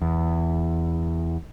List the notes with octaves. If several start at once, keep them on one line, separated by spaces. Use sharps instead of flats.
E2